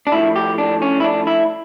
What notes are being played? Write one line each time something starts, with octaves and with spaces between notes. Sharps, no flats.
D4
A2 F3 E4
G4
D4
C#4
E4
D4
E4